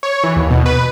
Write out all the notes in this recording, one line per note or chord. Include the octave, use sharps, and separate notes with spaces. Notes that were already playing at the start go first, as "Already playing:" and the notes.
C#5
E3
D#2
B2
B4